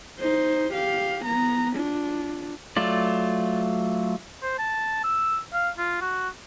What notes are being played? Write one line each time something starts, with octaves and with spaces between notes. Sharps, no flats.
D#4 C5
G4 F5
B3 A#5
D4 F4
F#3 A3 F4 D5
C5
A5
E6
F5
F4
F#4